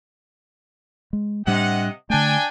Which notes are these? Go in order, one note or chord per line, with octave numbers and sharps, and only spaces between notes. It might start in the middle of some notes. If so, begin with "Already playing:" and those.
G#3
A2 C3 G3 D4 D#5 F#5
D3 A3 D4 G5 G#5